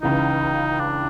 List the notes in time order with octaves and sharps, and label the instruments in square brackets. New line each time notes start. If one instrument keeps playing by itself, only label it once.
[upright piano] C#2 C#3 E3 [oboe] D#4
[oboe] D4